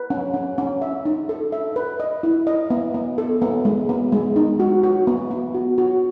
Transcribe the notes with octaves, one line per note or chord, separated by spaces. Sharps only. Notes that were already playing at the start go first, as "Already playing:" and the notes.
Already playing: B4
C#4
C#4
C#4
E5
D#4
A4
E5
B4
D#5
E4
D#5
B3
B3
A4
B3
G#3
B3
G#3
D#4
F#4
F#4
B3
B3
F#4
F#4